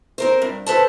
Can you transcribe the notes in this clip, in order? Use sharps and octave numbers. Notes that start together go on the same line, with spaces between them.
C4 A#4 C5
G2
A4 B4 C5 A5